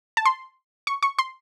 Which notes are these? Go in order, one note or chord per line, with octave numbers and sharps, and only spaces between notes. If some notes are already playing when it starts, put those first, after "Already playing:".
A5
C6
C#6
C#6
C6